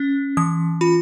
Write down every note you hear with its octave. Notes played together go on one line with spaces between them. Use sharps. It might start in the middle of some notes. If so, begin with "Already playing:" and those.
Already playing: C#4
E3 D#6
F4 B5